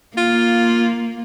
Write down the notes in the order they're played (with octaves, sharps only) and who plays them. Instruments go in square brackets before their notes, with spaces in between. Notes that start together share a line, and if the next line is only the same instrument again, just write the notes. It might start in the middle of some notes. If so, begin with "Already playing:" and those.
[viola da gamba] A#3 [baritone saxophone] F4